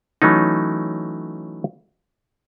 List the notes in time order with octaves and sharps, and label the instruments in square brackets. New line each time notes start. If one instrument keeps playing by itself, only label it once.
[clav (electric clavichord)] E3 F#3 A3 C#4 D#4